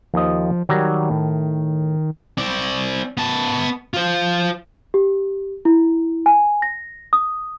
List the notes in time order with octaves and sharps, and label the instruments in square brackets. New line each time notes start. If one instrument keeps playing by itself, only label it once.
[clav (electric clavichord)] D#2 D#5 [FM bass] F3
[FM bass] D#3 [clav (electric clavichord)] F#3 G3 A#5
[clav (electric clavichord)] A2
[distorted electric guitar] C4 D5
B3 A5
F4 C5
[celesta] G4
E4
G#5
A#6
D#6